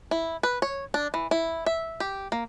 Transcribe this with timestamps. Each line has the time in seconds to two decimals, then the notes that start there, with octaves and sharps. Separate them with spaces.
0.11 E4
0.43 B4
0.62 C#5
0.94 D4
1.14 E3
1.31 E4
1.66 E5
2.00 G4
2.32 A#3